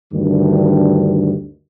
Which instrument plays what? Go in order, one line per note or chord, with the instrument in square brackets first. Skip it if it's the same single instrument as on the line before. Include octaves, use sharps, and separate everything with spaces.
[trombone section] D2 G2 D#3